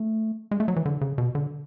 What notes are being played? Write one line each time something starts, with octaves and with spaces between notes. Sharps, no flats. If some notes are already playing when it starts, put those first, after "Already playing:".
Already playing: A3
G#3
A3
F#3
E3
D3
C#3
B2
D3